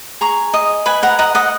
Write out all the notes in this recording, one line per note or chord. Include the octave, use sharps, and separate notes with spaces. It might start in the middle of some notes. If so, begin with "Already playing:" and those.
G#4 A#5 C#6
D#5
B4 G#5 B5
F#5 A#5
D#5 F#5 A#5
D#5 F#5